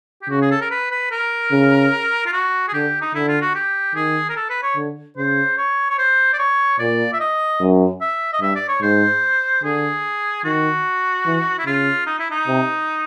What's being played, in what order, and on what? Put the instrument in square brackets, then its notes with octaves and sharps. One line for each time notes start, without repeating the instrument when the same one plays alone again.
[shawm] G4
[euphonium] C#3 [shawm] F#4
[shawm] G#4
A4
A#4
B4
B4
A#4
[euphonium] C#3
[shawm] F4
F#4
G#4
[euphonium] D3 [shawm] G4
[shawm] D#4
[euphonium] D3 [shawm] E4
[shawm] F4
F#4
G4
[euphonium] D#3 [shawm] G#4
[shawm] A#4
A4
B4
C#5
[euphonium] D3
[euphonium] C#3 [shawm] C5
[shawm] C#5
C#5
C5
D5
C#5
[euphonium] A#2 [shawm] D5
[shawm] E5
D#5
[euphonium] F#2
[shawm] E5
D#5
[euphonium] G2 [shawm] E5
[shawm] D5
C#5
[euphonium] G#2 [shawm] C5
[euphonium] D3 [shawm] G#4
[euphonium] D#3 [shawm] F#4
[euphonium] E3
[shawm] E4
[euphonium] C#3 [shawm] F4
[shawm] D#4
E4
D#4
[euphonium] C3